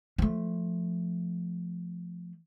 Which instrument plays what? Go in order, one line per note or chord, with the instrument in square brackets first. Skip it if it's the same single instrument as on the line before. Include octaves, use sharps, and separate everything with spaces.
[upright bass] F3 A3